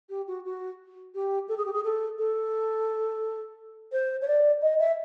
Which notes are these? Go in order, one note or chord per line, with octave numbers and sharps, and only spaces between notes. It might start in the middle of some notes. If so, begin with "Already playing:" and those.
G4
F#4
F#4
G4
A4
G#4
G4
G#4
A4
A4
C5
C#5
D5
D#5
E5